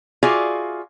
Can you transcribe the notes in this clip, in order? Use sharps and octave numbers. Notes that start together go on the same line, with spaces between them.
F4 F#4 G#4 D5 E5 F5